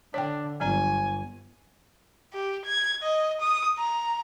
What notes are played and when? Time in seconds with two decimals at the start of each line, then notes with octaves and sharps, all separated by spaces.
0.14 D3 D4 C#5 G5
0.60 G1 F#3 D5 G#5 A#5
2.33 G4
2.65 G#6
3.02 D#5
3.41 D#6
3.78 A#5